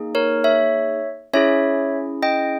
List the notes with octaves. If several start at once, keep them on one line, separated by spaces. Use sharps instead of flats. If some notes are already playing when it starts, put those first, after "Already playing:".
Already playing: A#3 D#4 G#4
A#4 C#5
C#5 E5
C#4 E4 G#4 C#5 E5
D#5 G5